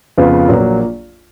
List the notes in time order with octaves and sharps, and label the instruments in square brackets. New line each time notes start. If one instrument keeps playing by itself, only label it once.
[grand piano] F2 C#3 F3 B3 F4
A#1 A#2 F#3 A#3